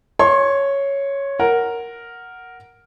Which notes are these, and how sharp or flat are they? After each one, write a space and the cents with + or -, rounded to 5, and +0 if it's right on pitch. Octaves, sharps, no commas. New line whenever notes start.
C#5 +0 C6 +30
A#4 +0 F#5 +0